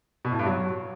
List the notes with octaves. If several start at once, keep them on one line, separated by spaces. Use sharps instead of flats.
B2
A2
G2
F#3